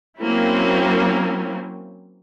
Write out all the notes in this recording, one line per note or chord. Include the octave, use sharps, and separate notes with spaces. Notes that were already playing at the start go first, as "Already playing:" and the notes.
F#3 A#3 C4 C#4 E4